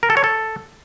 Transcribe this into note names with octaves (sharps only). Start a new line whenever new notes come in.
A#4
A4
C#5
A4